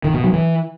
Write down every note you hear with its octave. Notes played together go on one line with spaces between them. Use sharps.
D#3
B2
F#3
E3